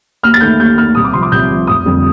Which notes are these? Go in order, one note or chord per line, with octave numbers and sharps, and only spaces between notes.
D#2 F6
A6
D#3 A3 G6
D#2 G6
D#3 A3 F6
C2 D#6
D6
C3 F3 C6
D6
C2 G6
C3 F3
F1 D#6
F2 D3 G3